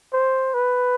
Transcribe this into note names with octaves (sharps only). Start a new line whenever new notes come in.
C5
B4